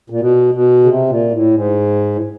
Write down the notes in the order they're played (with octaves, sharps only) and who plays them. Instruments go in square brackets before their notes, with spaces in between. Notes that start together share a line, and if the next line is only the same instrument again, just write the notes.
[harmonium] A#2
B2
B2
C#3
C3
A#2
A2
G#2
A2